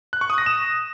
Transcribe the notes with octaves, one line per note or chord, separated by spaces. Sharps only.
F#6
C#6
D#6
A#6
E7